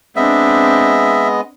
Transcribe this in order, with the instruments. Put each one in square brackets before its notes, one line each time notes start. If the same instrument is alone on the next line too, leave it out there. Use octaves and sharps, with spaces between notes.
[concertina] G#3 B3 D#5 [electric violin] C4 D4 [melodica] E5